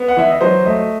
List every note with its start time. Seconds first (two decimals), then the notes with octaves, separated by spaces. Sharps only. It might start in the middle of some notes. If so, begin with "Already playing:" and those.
Already playing: B3
0.08 F#5
0.17 E3 E5
0.30 D#5
0.41 F#3 C5
0.65 A3 D#5